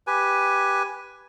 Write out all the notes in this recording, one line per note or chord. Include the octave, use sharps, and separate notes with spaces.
G4 B4 G#5